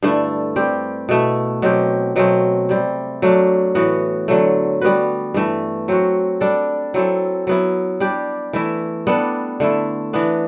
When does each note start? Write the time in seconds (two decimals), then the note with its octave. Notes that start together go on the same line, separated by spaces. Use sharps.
0.02 G2 D3 A3 E4
0.56 G3 C4 G4
1.09 B2 A3 E4
1.62 B2 F#3 C4 G4
2.16 B2 F#3 A3 C4
2.69 C3 G3 C4
3.22 F#3 A3 D4
3.75 A2 E3 B3 F#4
4.28 D3 F#3 A3
4.81 G3 B3 F#4 B4
5.34 G2 E3 A3
5.88 F#3 C4 F#4
6.41 G3 D4 A4
6.94 F#3 C4 E4 A4
7.47 F#3 B3 E4
8.00 G3 D4 G4
8.53 E3 A3 E4
9.07 G3 B3 D4 A4
9.60 D3 A3 E4
10.13 E3 B3 D4